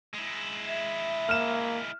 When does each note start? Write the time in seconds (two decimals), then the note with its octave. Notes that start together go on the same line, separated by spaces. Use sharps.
0.14 G#3 E4
0.68 E5
1.29 A#3 F6 E7